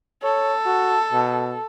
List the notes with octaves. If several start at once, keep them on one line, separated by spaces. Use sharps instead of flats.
A4 C#5
F#4
B2